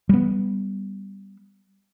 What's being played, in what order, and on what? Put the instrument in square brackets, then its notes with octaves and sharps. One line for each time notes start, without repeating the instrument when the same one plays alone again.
[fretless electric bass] G3 B3